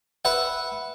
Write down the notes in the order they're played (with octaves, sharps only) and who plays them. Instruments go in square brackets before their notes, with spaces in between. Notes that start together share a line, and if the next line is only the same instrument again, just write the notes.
[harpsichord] B4 E5 F#5